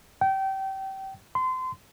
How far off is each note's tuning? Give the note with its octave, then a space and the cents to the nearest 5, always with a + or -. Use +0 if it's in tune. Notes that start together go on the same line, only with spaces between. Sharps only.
G5 -25
C6 -30